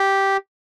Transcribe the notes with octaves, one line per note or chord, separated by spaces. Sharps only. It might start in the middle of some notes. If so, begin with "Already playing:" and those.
Already playing: G4